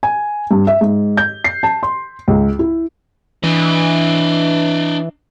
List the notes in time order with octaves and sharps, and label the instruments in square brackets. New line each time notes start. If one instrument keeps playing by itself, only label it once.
[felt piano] G#5
G2
E5
G#2
G6
C7
A5
C6
C#2
E4
[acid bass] E3 [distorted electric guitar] D4 D#5